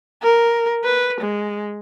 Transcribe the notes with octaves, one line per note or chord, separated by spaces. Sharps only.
A#4
B4
G#3